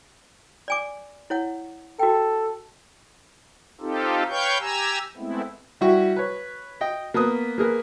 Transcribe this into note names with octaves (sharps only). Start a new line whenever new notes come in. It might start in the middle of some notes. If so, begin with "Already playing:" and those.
D5 G#5 D6
E4 C#5 F#5
F#4 A4 G5
C4 D#4 F4 G4 A4
B4 C#5 F5 G5 C#6 G6
G4 G#5 A#5 E6
G#3 A3 B3 C4 E4
G3 E4 F#4
B4 C#5
D#5 G5
A#3 B3 B4 D#6
A#3 G#4 A#4 B4